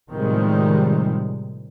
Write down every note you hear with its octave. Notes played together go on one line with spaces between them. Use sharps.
A2 C3 D#3 F3 G3 G#3